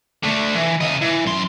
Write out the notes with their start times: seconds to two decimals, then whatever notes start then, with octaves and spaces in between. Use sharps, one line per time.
0.23 D3 A3
0.55 E3
0.81 C#3 D#5
1.01 E3
1.26 F#2 C6